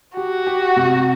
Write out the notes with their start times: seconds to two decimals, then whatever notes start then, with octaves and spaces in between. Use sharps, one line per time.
0.16 F#4 G4
0.47 G4
0.76 C3